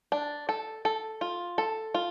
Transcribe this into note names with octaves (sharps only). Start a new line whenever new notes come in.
D4
A4
A4
F4
A4
F4